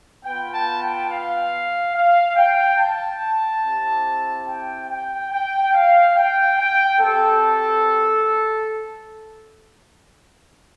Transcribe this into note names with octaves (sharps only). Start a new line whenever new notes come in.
B3 F4 G5
A5
G5
F5
F5
G5
A5
C4 E4 G4
G5
G5
G5
F5
G5
G5
C4 G4 A4